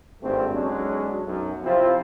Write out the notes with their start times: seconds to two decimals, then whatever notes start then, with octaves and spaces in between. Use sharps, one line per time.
0.22 G#1 G2 A#2 A3 C4
0.52 B1 F#3 G#3 C#4 D4
1.24 B1 F#2
1.64 C3 F3 C4 E4 F4